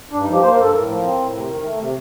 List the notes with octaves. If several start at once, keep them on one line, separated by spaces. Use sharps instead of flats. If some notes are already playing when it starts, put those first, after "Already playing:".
G2 D4
D#4
F3
G4
A#3 C5
A#4
G2 A4
A2 A#4
F3
C4
A2
C3
D#3
A3
C3